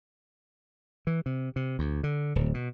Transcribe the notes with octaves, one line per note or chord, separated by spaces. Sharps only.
E3
C3
C3
D2
D3
D1
B2